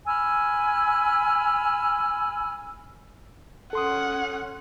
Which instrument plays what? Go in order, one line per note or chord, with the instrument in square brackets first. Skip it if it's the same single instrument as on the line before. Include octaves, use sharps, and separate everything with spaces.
[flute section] G#5 B5 E6 F6
[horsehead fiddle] C#4 F#5 [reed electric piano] A4 C6 D#6